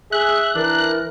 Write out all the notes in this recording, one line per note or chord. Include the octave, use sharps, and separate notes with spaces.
G#4 E5 F#6
E3 D4 A#4